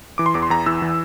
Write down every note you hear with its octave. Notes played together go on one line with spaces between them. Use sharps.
E3 D6
C6
E2 D6
C6
E2 A#5
E3 E6
E3